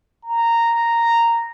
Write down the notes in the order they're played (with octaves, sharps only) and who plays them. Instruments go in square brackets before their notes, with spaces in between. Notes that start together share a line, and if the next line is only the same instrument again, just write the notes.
[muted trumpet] A#5